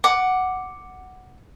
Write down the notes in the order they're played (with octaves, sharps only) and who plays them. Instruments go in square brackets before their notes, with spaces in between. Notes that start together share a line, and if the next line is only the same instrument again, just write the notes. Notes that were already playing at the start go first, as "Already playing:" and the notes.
[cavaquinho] F#5 D6